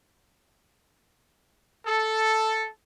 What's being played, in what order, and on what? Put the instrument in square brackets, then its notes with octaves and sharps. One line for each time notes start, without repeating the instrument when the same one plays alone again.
[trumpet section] A4